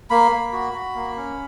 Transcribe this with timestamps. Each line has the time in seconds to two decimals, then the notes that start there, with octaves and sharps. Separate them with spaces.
0.10 A#3 B5
0.32 A#3
0.53 F#4
0.74 F#4
0.95 A#3
1.17 C#4